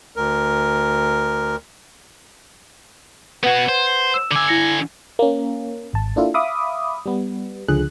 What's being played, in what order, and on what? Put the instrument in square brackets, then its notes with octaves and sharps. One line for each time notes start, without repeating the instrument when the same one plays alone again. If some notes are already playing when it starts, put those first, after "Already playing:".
[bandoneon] D2 A#4
[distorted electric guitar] B3 F#4 [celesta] B4 F#5 G#6
[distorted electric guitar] C5
[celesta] E6 E7
[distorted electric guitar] D3 G#5 [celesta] D6 E6
[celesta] E4 A#6 C#7
[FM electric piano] A#3 C#4
G#1 A5
A#3 D4 E4 F4 A4
E5 F5 B5 D6 D#6
G3 B3
C#2 D3 F3 G#4 F#6